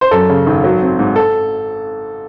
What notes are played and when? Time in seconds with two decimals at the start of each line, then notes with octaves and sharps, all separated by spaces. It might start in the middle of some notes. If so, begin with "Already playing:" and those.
0.01 C5
0.11 F#2 A4
0.29 C#3
0.46 G#1
0.64 F#3
0.82 C4
0.99 G#2
1.16 A4